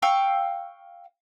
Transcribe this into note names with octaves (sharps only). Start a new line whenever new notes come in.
F5 G5 C#6 E6